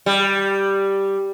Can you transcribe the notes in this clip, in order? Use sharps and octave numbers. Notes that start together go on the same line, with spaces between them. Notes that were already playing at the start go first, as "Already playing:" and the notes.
G3